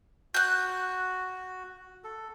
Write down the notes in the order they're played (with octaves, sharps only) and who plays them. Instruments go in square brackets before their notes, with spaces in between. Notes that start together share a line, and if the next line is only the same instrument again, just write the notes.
[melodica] F#4 [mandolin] F#6 G6
[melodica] A4